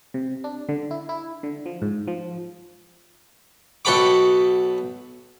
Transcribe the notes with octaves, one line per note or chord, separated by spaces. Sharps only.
C3
D4
D3
E4
E4
D3
F3
G#2
F3
B1 F#4 A4 G5 B5 D6